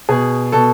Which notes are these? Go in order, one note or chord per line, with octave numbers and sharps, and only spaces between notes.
B2 G#4
B2 A4